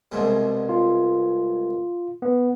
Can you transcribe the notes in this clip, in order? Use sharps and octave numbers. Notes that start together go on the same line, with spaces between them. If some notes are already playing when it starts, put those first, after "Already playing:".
C2 G#2 B2
F4
B3